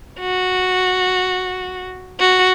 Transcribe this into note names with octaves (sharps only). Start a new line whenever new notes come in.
F#4
F#4